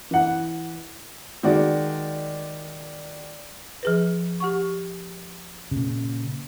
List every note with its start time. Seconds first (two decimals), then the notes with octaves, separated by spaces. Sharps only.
0.11 E3 F#5
1.43 D#3 G#3 F#4 D5
3.83 F3 G#4 B4
4.40 G4 F#5 C#6
5.71 A#2 C#3